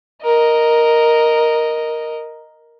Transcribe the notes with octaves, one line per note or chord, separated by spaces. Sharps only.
A#4 D#5